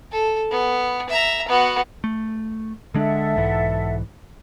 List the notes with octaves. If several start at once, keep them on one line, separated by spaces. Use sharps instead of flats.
A4
B3
E5 A#5
B3 F#4
A3
D3 G#3 D4 A4 E5 F#5
B1 G#2 E3